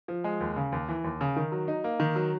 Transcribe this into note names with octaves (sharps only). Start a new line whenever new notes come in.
F3
G#3
D#2
C#3
D#2
E3
D#2
C#3
D#3
F#3
D#4
A#3
D#3
F#3